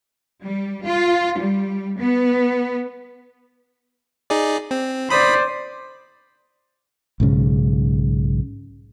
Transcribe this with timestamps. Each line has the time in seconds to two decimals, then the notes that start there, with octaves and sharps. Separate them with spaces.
0.43 G3
0.86 F4
1.39 G3
1.99 B3
4.30 D#4 G#4 D5
4.71 C4
5.10 C5 D5 B5 D#6 B6
7.20 B1 G#2 C#3